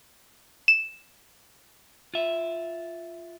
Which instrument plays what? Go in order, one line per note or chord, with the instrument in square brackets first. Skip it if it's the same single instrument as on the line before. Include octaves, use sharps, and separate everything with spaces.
[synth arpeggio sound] E7
[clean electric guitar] F4 E5